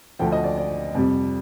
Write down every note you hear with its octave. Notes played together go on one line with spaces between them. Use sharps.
D2 D3 F3 G5
D#5
D5
D5
F2 C3 G3